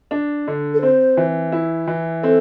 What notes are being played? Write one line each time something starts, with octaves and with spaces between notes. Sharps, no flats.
D4
D3
A4
C4 C5
E3
E4
E3
C4 A4